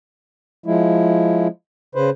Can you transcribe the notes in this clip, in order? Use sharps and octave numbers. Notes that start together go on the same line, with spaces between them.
F3 G#3 E4
C#3 B4 C5